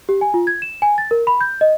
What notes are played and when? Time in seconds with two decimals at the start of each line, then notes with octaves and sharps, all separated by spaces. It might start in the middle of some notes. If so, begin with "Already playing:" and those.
0.09 G4
0.21 G#5
0.34 F4
0.47 G#6
0.62 E7
0.82 G#5
0.98 A6
1.11 A#4
1.27 B5
1.41 G6
1.61 D#5